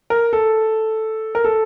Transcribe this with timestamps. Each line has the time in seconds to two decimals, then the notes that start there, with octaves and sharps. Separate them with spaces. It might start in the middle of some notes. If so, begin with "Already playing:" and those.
0.10 A#4
0.33 A4
1.35 A#4
1.44 A4